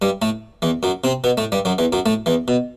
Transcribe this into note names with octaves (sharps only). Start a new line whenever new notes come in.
G2 G3
A2 A3
E2 E3
F#2 F#3
C3 C4
B2 B3
A2 A3
G2 G3
F#2 F#3
E2 E3
F#2 F#3
A2 A3
E2 E3
B2